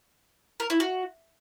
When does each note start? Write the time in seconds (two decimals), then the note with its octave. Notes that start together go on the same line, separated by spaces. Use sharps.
0.60 A#4
0.70 E4
0.80 F#4